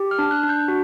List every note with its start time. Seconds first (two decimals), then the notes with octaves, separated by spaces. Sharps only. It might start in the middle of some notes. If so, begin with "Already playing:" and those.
Already playing: G4
0.11 F6
0.19 D4
0.31 F#6
0.43 D4
0.49 G6
0.68 F#4